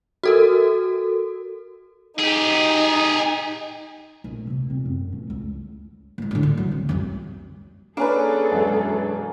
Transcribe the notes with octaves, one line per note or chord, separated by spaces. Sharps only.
F#4 A4 A#4
D#4 G4 G#4
A#1 A3
C3 A#3
A#2 C4
F#2
E3 A3
C#2
A2 G#3
A2 D3
G2
C#3 F#3
C4
C2 F#2
A#3 C#4 D4 G#4 A4 B4
E1 F#2